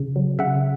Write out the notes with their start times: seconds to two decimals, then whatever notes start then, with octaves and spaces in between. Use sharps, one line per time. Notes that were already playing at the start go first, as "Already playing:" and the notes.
Already playing: C#3
0.16 F#3
0.39 C#3 E5 F#5